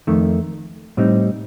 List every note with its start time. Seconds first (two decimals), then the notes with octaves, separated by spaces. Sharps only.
0.07 F2 D#3 A3
0.97 A2 G3 C4 D#4